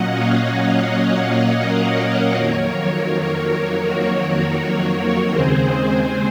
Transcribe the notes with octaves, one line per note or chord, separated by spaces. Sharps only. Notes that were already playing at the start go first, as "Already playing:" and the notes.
Already playing: A#2 F#3 A#3 C#4 D#5 F#5
C#5 F5
A#4 C#5
F2 D#3 F#3 A#3 A#4 C#5
F#4 A#4
D#2 C#3 G#3 C4 G#4 C5